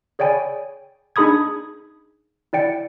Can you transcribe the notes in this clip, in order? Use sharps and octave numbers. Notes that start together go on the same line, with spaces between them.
G#4 C#5 D5 G5 G#5 B5
D4 D#4 G#4 B5 D#6 G#6
E4 D5 G5 C#7